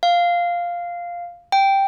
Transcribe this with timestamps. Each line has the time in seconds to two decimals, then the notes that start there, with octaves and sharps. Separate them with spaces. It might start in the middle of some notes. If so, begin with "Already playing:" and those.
0.03 F5
1.52 G5